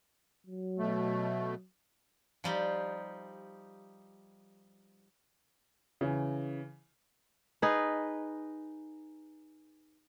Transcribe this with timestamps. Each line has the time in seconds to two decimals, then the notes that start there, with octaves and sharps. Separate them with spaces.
0.47 F#3
0.79 B2 A3
2.44 F3 G3 D#4 G4
6.01 C#3 E3
7.62 D#4 G#4 B4